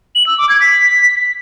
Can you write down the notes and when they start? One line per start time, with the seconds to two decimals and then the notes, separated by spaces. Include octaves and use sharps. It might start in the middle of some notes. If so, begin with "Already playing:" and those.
0.15 F#7
0.27 E6
0.38 D6
0.49 G#6
0.61 B6